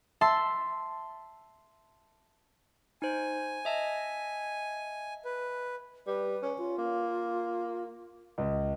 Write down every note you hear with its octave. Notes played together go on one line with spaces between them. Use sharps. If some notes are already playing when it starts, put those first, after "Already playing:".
E5 A5 C6 E6
D#4 C5 G#5
D#5 E5 A5
B4
G3 B4
C#4
F4
A#3
C#2